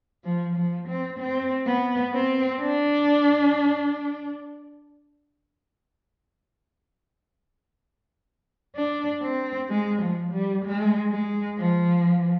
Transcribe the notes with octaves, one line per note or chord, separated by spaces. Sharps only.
F3
F3
C4
C4
B3
C4
D4
D4
C4
G#3
F3
G3
G#3
G#3
F3